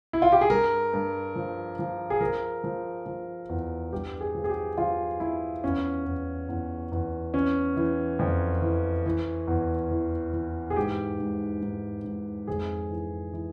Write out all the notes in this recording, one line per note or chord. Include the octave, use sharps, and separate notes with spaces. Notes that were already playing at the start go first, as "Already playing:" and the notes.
E4
F4
G4
G#4
G2 A#4
G2
F3
F3
G#4
F3 A#4
F3
F3
E2
G2 G4
G#4
F3
G#4
G4
F3 F4
F3 E4
E2 C#4
E2
E2
E2
E3 C#4
E3
F2
E3
E3
E2
E3
E3
G#4
G#2 G4
G#2
G#2
G#2
F2 G#4
E3
E3